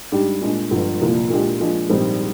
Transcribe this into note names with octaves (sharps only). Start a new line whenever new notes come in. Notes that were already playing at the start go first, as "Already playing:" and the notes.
G#2 G3 D4 G4
A#2 G#3 D4
G1 G2 D3 F3
C2 A#2 F3 A#3
A#2 G#3 D4 G4
A#2 F3 G#3 D4
A#1 G#2 D#3 G3 C4